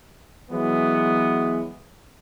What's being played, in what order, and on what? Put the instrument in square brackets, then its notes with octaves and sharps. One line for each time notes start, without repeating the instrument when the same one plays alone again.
[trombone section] E3 F#3 G#3 B3